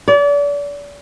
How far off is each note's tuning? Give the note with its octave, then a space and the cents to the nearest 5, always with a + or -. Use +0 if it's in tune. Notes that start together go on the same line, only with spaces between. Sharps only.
D5 -35